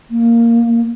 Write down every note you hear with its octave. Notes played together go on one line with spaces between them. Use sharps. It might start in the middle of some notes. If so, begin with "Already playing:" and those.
A#3